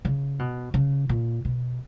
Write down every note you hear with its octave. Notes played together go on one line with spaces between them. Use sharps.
C#3
B2
C#3
A#2
B2